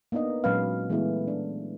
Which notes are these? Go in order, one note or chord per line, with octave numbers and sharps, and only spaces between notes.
A#3 B3 D4 D#4 D#5
A#2 F#3 G#3 C#4 B4 F5
E3 G#3 A3 B3 E4 G#4
D4